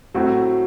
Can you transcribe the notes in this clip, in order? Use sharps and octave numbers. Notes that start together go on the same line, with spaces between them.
A2 F#3 A3 C4 F#4